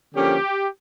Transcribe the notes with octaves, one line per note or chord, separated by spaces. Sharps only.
D3 F3 A#3 C#4 G4